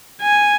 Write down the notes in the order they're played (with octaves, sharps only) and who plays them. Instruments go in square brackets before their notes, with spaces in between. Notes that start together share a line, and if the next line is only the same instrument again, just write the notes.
[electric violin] G#5